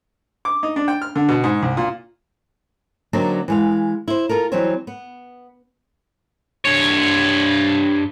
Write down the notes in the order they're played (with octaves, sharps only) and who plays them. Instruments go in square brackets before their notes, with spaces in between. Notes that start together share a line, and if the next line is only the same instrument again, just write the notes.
[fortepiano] D6
D#4
D4
G5
F6
D3
B2
G#2
C2
A#2
[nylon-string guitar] D3 F#3 A#3 C4 D4 D#4
E3 G#3 F5
E4 C5
F4 A4 A#4
E3 F#3 G3 C4 C5 C#5
B3
[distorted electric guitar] G2 C#5